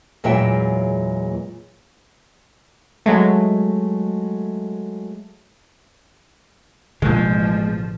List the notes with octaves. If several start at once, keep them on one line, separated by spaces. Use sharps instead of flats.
E2 A#2 F#3 G#3 E5 G5
F#3 G#3 A3
A1 B2 D3 F3 G#3 A#3